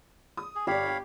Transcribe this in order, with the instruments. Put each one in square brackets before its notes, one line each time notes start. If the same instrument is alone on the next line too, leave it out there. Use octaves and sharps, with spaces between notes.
[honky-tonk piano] D#6
[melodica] G#4
[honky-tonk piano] G1 D5 [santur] G4 [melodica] C#5 F5 B5
[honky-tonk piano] G5